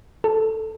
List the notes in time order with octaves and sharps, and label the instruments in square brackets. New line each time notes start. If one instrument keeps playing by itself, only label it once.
[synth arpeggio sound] A4